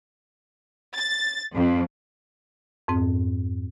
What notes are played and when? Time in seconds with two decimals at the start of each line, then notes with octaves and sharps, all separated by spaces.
0.94 A6
1.54 F2
2.88 F2 G#2 C4